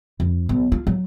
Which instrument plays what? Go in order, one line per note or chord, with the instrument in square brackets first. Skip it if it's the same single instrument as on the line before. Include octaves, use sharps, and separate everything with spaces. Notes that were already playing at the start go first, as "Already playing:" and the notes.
[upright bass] F2
B1
F4
F#3